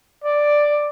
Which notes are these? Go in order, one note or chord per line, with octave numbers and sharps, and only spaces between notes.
D5